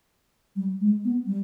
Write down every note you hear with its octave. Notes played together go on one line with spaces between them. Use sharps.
G3
G#3
B3
G3